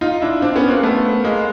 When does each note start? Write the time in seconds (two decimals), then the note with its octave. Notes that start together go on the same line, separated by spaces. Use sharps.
0.01 D#4 F4
0.21 D4 E4
0.42 C4 D4
0.56 B3 C#4
0.69 A#3 C4
0.83 A3 B3
1.24 G#3 A#3